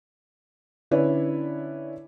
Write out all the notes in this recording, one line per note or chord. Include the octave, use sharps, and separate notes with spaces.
D3 C#4 E4 B4 C#5 D5